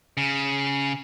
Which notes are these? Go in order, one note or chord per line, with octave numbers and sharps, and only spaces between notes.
C#3